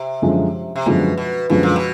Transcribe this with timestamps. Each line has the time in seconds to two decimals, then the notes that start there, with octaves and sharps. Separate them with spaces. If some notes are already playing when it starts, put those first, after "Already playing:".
Already playing: C3
0.22 F#2 D3 F3 G#3
0.76 C3
0.86 F#2 B2 D3 F3 G#3
1.17 B2
1.50 F#2 B2 D3 F3 G#3
1.63 A#2
1.76 B2